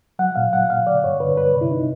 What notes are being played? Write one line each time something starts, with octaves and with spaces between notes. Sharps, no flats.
F#3 F#5
A#2 F5
F#3 F#5
A#2 F5
D3 D5
G2 C#5
D3 B4
G2 B4
C3
E4
C3 D#4